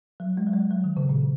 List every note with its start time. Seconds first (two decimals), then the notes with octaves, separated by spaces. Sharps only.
0.20 F#3
0.37 G#3
0.47 F#3
0.53 G#3
0.71 F#3
0.84 D#3
0.97 C#3
1.09 A#2